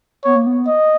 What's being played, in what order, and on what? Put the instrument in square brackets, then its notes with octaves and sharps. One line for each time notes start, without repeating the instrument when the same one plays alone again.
[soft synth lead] B3 [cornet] C#5
[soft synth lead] A#3
B3
[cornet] D#5